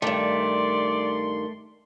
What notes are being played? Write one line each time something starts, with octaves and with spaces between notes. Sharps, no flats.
G2 D#3 A3 D5 C6